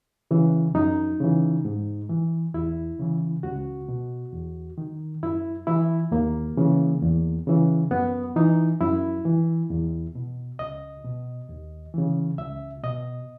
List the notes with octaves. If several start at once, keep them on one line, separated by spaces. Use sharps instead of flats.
C#3 E3
F#2 D#4
C#3 E3
G#2
E3
E2 E4
C#3 E3
C#2 F#4
B2
E2
D#3
F#2 E4
E3 E4
D#2 A#3
C#3 E3
E2
C#3 E3
F#2 B3
E3 D#4
F#2 E4
E3
E2
B2
C#2 D#5
B2
D#2
C#3 E3
C#2 E5
B2 D#5